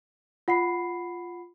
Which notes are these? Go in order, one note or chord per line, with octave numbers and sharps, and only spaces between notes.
F4 F#5 B5 C7